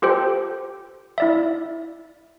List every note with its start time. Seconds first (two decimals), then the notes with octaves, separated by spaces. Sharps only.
0.02 F4 G4 A4 C5 G5
1.18 E4 D5 E5